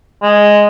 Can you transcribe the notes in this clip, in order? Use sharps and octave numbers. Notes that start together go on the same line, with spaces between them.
G#3